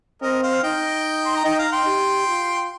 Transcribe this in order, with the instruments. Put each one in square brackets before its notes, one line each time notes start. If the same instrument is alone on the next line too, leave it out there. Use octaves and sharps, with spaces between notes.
[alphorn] C4 [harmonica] A#4 D#5
[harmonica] C5 F5
[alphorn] D#4 [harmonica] D#5 G5
[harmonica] C6
A#5
[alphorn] D#4 [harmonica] D#5 G5
[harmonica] F5 A#5
G5 C6
[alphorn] G4
F4